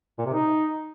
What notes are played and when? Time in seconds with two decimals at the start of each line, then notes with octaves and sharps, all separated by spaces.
0.18 A#2
0.26 C3
0.33 D#4